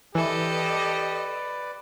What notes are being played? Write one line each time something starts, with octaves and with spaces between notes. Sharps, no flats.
E3 G4 A4 B4 D5 D#5